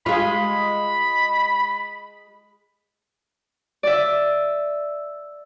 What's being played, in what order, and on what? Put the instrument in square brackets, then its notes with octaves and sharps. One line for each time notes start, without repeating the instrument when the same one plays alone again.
[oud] G#3 F4 [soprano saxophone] B5
[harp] D5 E5